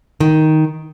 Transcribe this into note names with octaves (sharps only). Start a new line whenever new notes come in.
D#3